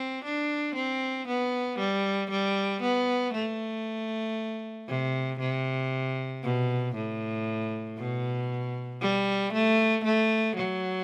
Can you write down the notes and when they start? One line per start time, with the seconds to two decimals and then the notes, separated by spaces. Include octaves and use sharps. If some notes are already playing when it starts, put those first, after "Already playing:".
Already playing: C4
0.24 D4
0.75 C4
1.27 B3
1.79 G3
2.30 G3
2.82 B3
3.33 A3
4.88 C3
5.40 C3
6.43 B2
6.95 A2
7.98 B2
9.01 G3
9.53 A3
10.04 A3
10.56 F#3